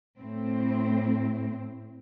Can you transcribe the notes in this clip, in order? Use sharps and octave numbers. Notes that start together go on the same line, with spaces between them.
A2 C4